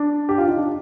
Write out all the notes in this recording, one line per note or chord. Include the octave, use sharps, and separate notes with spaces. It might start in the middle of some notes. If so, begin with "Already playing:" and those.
Already playing: D4
G4
F4
D#4
D4